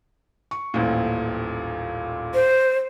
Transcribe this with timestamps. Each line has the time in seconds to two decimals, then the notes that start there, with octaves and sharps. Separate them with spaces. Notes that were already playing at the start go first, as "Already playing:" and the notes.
0.51 C#6
0.74 D#1 A1 A#2
2.34 C5